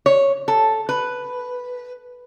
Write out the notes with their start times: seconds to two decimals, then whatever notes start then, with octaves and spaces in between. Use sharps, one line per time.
0.06 C#5
0.48 A4
0.89 B4